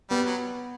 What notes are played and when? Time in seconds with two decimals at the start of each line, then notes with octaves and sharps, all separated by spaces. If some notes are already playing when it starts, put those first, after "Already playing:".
0.10 G3 B3
0.26 F#3